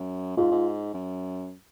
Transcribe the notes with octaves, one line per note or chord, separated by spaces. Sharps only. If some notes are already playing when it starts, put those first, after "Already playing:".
Already playing: F#2
G#2 F4
G#2
F#2